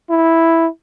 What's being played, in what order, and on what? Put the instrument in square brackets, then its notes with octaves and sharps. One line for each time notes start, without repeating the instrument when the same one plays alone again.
[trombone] E4